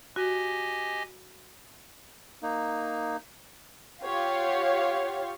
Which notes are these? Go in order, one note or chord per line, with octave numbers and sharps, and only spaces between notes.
F#4 G4 D#5 G#5
A#3 D#4
F4 G4 C#5 F5 F#5